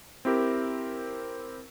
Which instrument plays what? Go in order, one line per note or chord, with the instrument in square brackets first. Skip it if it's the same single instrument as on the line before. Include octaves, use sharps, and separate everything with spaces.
[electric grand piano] C4 E4 G4 A#4